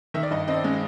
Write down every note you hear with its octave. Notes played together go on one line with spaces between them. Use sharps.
D#3 E5
D5
G2 D#5
C4 D#5
D5
G#3